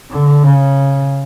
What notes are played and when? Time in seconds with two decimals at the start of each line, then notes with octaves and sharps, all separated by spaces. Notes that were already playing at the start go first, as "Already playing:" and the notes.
0.11 D3
0.43 C#3